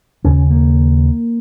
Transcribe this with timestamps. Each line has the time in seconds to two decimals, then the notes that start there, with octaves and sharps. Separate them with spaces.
0.24 D#2 C#3 C#4
0.50 A#3